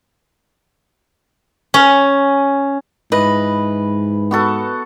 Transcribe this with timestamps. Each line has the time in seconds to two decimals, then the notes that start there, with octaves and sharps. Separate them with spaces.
1.74 C#4
3.12 G#2 E3 B4 D#5
4.31 B3 F#4 A4